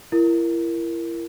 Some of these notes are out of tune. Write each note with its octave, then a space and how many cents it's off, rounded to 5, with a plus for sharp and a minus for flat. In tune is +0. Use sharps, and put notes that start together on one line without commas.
E4 +35 A#4 +0